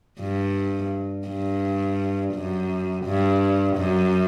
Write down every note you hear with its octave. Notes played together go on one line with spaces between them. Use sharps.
G2
G2
F#2
G2
F#2